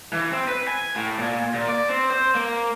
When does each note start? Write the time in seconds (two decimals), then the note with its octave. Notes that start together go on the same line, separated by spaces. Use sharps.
0.13 E3
0.31 C4
0.48 B4
0.67 G#5
0.95 A2
1.18 A#2
1.54 A#2
1.68 D5
1.89 C4
2.10 C5
2.35 A#3